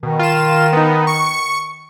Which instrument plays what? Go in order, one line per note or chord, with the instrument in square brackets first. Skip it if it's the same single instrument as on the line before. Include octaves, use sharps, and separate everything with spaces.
[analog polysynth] B2 [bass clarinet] D#3
[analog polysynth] F4 E7
B3 D#4
C#6 C#7